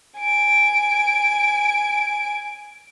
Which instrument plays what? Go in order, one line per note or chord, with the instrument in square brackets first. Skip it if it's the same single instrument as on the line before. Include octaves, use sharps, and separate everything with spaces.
[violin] G#5 D7